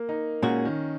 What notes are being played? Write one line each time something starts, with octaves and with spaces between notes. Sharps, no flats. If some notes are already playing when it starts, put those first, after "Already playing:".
Already playing: A#3
D#4
A#2 G#3 C#4 F#4
D#3